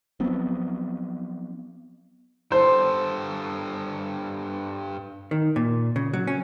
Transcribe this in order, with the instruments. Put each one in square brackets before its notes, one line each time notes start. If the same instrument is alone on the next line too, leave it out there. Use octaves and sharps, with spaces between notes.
[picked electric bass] F3 F#3 B3 C4
[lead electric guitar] G2 A4 [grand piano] C5
[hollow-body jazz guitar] D#3
A#2
C#3
F#3
C#4